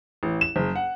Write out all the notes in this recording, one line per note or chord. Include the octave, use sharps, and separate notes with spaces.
A1
E7
F#1
F#5